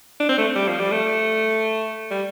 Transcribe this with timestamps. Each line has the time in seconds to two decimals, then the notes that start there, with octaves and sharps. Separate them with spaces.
0.20 D4
0.29 C4
0.38 A3
0.55 G3
0.68 F3
0.80 G3
0.92 A3
2.11 G3